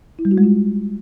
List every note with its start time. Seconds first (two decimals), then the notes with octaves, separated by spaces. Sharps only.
0.19 E4
0.25 G3
0.31 F#4
0.38 G#3
0.44 F4